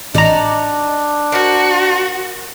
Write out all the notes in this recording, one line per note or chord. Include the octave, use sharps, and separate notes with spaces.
A1 D4 D#4 F#4 D5 A#5
F#4 A#4 C5